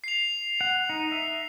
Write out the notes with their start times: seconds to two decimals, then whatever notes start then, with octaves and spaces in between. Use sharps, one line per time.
0.04 C7 F7
0.61 F#5
0.89 D#4
1.12 E5